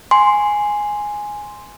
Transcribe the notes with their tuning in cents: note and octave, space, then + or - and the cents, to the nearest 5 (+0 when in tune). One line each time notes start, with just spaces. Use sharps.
G#5 +0 C6 +0